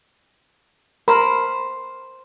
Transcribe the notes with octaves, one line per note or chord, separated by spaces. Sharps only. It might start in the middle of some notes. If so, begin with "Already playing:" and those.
A#4 C5 B5